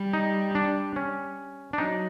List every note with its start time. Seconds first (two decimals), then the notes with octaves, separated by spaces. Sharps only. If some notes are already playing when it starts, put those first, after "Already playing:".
Already playing: G3
0.13 D#4
0.55 D4
0.96 C#4
1.73 D4
1.78 F#3 D#4